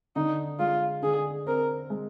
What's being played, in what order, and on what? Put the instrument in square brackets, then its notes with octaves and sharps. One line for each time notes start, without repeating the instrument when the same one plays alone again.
[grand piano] D3 [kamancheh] D#4
[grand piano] G#3 [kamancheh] F4
[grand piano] D3 [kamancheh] G#4
[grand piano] C4 [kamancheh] A#4
[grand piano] G#3